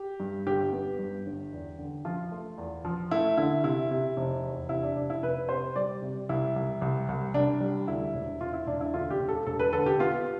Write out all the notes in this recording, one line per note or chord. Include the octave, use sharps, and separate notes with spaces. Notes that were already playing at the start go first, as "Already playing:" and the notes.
Already playing: G4
G2
G1 G4
B3
G2
G1
E2
D3
F3 F4
A3
E2
F3
A3 E4
D3 E4
C3 E4
C3
F1
E2
C3 E4
D4
F1 D4
E4
F1 B4
C3 C5
G3 D5
C3
C2 E4
C2
C2
C2
C2 D4
G3
D2 E4
E1
E1 F4
E4
E1 D4
E4
D2 F4
G4
E1
A4
E1 A4
B4
D3 A4
G4
B3 F4